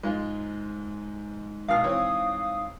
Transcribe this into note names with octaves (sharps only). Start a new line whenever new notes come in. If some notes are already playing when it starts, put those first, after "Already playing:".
G#2 G#3 F4
G#1 B2 F5 D#6 F6
E3 C4 C#5